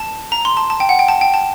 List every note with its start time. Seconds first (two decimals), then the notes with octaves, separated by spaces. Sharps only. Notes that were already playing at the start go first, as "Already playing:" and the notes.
Already playing: A5
0.32 A#5
0.45 C6
0.57 A5
0.70 A5
0.80 G5
0.89 F#5
0.99 G5
1.08 A5
1.21 G5
1.34 A5